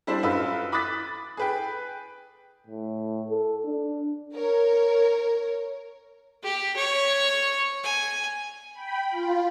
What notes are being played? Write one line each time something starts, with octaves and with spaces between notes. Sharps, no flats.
G3 D4 E4 C5
F#2 F4 B4 D#5 E6
B5 D6 D#6 F#6 A6 B6
G#4 B4 G5
A2
A4
D4
A#4 C#5
G4
C#5
G#5
G5 B5
F4